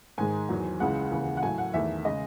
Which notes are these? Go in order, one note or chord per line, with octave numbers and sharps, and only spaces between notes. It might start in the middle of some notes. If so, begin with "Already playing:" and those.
G#2 D#3 G#3 G#5
E2 D#3 F#3
C#2 C#3 E3 G#3 F#5
D#2 C#3 E3
F#5
A2 F#3 A3 G#5
F#5
E2 D#3 A3 E5
C#3 G#3 D#5